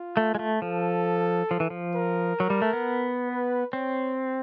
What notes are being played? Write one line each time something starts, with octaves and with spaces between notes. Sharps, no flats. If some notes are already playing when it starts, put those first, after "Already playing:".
Already playing: F4
A3
G#3
A3
F3 A4
F3
E3
F3
A#4
F#3
G3
A3
B3
B4
C4 C#5